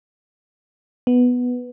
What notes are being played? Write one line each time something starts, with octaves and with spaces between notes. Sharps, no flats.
B3